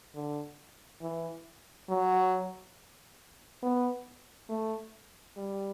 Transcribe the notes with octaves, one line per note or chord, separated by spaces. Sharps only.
D3
E3
F#3
B3
A3
G3